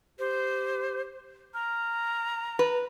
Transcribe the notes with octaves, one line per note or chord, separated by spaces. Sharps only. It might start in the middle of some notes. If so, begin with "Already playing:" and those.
G4 C5
A#5 F6
B4